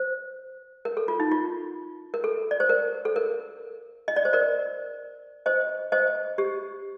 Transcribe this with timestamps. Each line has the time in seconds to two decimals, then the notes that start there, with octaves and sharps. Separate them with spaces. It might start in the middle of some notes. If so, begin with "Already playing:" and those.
Already playing: C5
0.85 A#4
0.97 A4
1.08 F4
1.20 D#4
1.31 F4
2.14 A#4
2.24 A4
2.51 D5
2.60 C5
2.69 A#4
3.05 A4
3.16 A#4
4.08 D#5
4.16 D5
4.25 C5
4.33 A#4 D5
5.46 C5 D#5
5.92 C5 D#5
6.38 G4